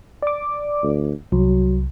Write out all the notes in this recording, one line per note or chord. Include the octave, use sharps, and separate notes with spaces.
D5 D6
D2
C2 F#3